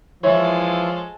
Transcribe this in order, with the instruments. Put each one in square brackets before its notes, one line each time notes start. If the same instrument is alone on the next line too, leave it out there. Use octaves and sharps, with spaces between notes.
[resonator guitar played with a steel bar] E3 E4 [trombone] F3 [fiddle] G#3 A4 [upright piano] C#5